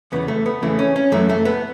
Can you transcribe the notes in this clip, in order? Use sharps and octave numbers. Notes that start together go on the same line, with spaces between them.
E2 C#3 E3 B3
A3
B3
E2 C#3 E3 A3
C#4
C#4
F#2 E3 A3
A3
B3